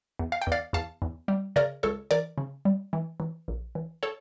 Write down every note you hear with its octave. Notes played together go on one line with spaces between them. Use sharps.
E2
F5
G5
E2 D5 F5
E2 F5 A5
E2
G3
C#3 A#4 D5
C#2 A4 C#5
E3 A#4 D5
C#3
G3
E3
E3
A#1
E3
A4 C#5